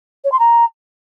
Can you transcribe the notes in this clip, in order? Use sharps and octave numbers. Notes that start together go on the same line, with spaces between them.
C#5
C6
A#5